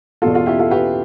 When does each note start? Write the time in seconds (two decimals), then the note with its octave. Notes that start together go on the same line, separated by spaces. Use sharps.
0.22 E2 B2 G3 F4 A4
0.34 F4 A4
0.46 E4 G4
0.59 F4 A4
0.71 G4 B4